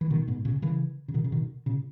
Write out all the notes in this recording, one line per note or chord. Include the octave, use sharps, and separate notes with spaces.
E3
B2 D#3
G#2 B2
A#2 C#3
C#3 E3
C#3
B2 D#3
C#3
B2 D#3
A#2 C#3